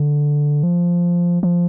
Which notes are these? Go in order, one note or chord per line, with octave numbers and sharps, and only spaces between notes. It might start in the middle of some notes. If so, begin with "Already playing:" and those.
Already playing: D3
F3
F3